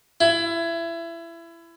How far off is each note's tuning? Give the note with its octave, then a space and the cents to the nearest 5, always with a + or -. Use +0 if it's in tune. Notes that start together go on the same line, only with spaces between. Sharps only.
E4 +25